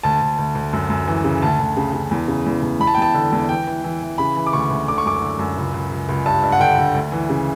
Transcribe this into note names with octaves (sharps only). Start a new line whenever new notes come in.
D2 A5
D2
D2
D2
F#2
F#2
E3
C#3
D2 A5
D2
C#3
C#3
E2
C#3
E2
E2
E2 B5
A5
G5
E2 A5
D3
E2
E3 G5
E3
E3
E3
C#3 B5
E3
D6
D2 C#6
D2
D3 D6
C#6
F#2 D6
D3
F#2
C#2
C#2
C#2
C#2
G2 A5
G2
F#5
D3 G5
D3
D2
E3
C#3